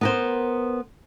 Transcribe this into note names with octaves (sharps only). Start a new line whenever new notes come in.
B3 A#4 C5